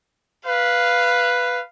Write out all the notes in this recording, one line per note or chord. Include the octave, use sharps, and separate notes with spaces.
B4 F5